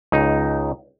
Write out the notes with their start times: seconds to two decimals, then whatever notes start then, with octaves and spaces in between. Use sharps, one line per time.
0.12 C#2 D#4